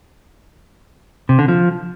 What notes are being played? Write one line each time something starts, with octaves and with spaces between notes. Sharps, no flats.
C3
D3
F3